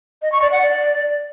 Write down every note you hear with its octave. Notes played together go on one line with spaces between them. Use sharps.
D#5
C#6
D5
F#5
D5